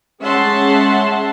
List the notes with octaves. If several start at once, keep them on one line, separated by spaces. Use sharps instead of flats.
G#3 C#4 E5 F#5 A5 C6